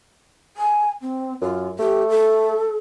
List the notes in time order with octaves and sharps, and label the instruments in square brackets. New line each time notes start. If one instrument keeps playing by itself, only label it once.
[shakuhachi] G#5
C4
[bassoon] F#2 [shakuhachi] F4
[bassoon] A3 [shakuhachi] G4
[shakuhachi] A4